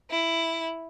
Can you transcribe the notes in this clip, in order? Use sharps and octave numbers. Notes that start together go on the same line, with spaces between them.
E4